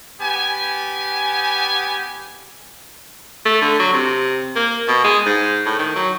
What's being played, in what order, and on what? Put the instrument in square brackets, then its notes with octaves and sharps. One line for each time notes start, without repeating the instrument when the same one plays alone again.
[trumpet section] B3 G4 G#5
[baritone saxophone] A3
D3
F#3
C3
A#3
B2
G#3
G#2
A2
D#3
F#3